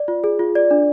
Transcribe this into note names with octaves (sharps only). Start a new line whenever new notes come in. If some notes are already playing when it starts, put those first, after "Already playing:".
Already playing: D5
F4
G#4
F4
D5
D4